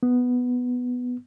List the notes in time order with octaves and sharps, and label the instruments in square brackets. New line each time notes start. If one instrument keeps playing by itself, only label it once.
[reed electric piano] B3